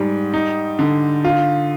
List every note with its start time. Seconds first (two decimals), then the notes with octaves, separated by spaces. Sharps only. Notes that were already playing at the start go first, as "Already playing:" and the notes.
Already playing: G#2 G3
0.34 D#4
0.79 D3
1.25 F4